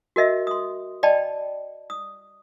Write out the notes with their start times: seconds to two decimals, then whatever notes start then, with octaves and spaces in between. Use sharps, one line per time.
0.16 F#4 A#4 D#5 E5
0.47 C6 D#6
1.03 D5 D#5 G5 A5 B5
1.90 D#6